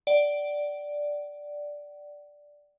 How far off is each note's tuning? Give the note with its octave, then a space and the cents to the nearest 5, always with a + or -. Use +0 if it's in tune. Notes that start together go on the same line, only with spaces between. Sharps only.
D5 +0 F#5 +45